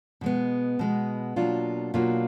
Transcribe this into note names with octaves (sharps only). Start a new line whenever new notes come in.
B2 G#3 B3
B2 G#3 B3
B2 F#3 A#3 D4 F4
B2 F#3 A#3 D4 F4